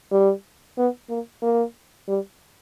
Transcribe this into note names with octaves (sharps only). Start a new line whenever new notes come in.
G3
B3
A#3
A#3
G3